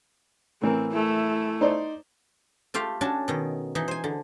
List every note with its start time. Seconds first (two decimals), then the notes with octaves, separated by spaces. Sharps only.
0.62 A2 E3 C4 A#4
0.92 A3 E4
1.61 D#4 C5 D5
2.74 A3 F4 G4 F5
3.01 C#4 D4 F#4 A5
3.28 B2 D#3
3.75 E3 D#4
3.88 C5 G#5
4.04 D3